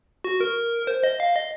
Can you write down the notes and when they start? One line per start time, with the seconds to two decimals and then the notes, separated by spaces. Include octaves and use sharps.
0.24 F#4
0.41 A#4
0.87 C5
1.03 D#5
1.20 F5
1.35 D#5